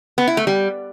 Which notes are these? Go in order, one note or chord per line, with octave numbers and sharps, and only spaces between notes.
B3
E4
A3
G3